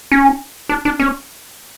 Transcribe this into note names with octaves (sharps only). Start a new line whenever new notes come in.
C#4
D4
D4
C#4